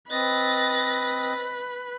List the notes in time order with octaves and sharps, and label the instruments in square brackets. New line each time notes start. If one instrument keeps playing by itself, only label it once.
[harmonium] C4 D#5 [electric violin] B4 [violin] A6 A#6